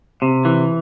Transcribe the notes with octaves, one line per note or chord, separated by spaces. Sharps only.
C3
E3